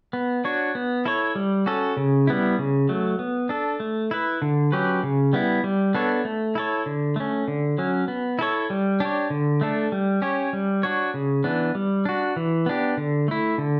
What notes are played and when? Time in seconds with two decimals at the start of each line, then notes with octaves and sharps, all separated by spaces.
0.13 B3
0.44 D4 F#4 C#5
0.75 B3
1.05 E4 A4 C#5
1.35 G3
1.66 C#4 F#4 A4
1.97 C#3
2.27 G3 B3 E4
2.59 C#3
2.89 F#3 A3
3.19 B3
3.49 D4 A4
3.80 A3
4.11 E4 B4
4.42 D3
4.72 F#3 C#4 G4 B4
5.03 C#3
5.33 G3 B3 E4
5.64 G3
5.95 B3 D4 A4 C#5
6.25 A3
6.55 E4 A4 C#5
6.86 D3
7.16 A3 C#4
7.48 D3
7.78 F#3 C#4
8.08 B3
8.39 E4 A4 C#5
8.70 G3
9.00 D4 G4 C#5
9.30 D3
9.61 A3 D4 A4
9.92 G3
10.22 C#4 G4 C#5
10.53 G3
10.83 D4 F#4 C#5
11.14 C#3
11.44 E3 B3 D4
11.75 G3
12.05 D4 F#4
12.36 E3
12.66 B3 D4 G4
12.97 D3
13.28 A3 E4
13.58 D3